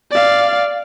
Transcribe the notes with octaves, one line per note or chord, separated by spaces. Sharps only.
D5 F5